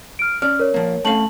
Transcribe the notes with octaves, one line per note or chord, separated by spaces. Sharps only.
F6 D7
C#4 D5 F6
A#4 C#5
F3 A#3
A3 C#4 F5 A5 F#7